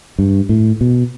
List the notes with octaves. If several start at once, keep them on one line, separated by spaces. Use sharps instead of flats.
G2
A2
B2